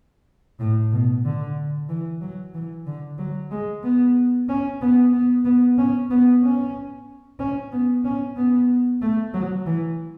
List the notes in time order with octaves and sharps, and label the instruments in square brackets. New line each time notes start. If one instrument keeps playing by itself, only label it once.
[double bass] A2
B2
D3
E3
F#3
E3
D3
F#3
G#3
B3
C#4
B3
B3
B3
C#4
B3
C#4
C#4
B3
C#4
B3
A3
F#3
E3